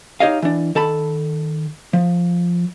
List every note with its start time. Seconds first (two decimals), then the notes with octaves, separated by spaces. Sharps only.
0.20 D#4 G4 C#5 D#5 F5
0.42 E3 D4
0.75 D#3 A4 A5 B5
1.93 F3